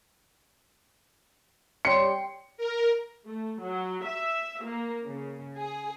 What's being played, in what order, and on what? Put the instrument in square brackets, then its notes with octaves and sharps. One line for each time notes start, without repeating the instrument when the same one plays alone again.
[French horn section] G3 C#5 [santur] G5 C6 [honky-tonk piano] C#7
[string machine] A#4
[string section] A3
F#3
E5
A#3
C#3
G#4